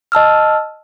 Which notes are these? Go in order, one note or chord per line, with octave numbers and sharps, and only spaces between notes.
D#5 A5 E6 F6